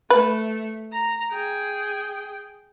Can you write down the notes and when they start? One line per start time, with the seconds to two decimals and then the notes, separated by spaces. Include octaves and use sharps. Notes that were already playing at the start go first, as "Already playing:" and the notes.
0.10 A3 B4
0.92 A#5
1.32 G#4 G5